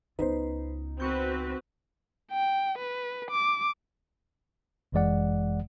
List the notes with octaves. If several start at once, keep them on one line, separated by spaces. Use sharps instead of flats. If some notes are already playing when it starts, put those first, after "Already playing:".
C#2 B3 D#4 B4 C5
C4 F#4 B4 C#6 G6
G5
B4
D6
G1 F#2 E3 G#3 D5 F#5